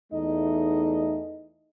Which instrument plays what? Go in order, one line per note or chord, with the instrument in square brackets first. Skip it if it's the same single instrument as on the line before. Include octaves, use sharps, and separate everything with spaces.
[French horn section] E2 A3 D#4 D#5